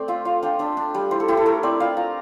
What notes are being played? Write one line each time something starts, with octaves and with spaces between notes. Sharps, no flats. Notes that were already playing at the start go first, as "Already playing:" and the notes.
Already playing: A3 C4 C5 D5
F4 E5
F4 F5
D4 G5
D4 E5
D4
G3
E4 C5
A4
E4 G4
A4
A3 A#4
C4 D5
F4 F5
F4 A#5